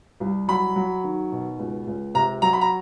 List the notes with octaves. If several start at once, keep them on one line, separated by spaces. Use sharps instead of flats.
C2
F#3 B5
F#3
D#3
B2
C#2
C#2
C3 A#5
F#3 A#5
B5
A#5